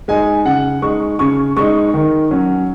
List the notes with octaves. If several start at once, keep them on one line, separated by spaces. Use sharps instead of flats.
G#3 D#4 G#5
C#3 F#5
G#3 D#4 C#6
C#3 C#6
G#3 D#4 C#6
D#3
F#3 C#4